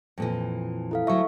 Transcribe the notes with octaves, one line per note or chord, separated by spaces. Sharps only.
F2 A#2 E3
E4 A4 F5
D2 F#3 E5 C#6